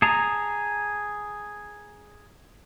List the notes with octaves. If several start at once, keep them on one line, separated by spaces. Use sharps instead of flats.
G#4 A5 A#5